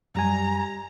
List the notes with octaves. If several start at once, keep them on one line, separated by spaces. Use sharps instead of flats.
F#2 G3 G#5 A#5